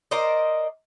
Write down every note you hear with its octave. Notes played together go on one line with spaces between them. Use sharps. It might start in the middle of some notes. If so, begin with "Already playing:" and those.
A#4 C5 D5 D#5